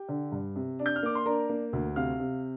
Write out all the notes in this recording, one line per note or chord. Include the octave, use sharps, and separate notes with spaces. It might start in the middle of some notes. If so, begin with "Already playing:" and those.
Already playing: G4 G5
D3
G2
C3
D4
G6
F6
A#3 D6
C6
D4 A#4 A#5
A#3
D2
C3 F5 F6
C3